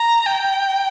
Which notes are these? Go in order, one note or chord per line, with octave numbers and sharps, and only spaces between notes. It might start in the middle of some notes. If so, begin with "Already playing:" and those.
Already playing: A#5
G5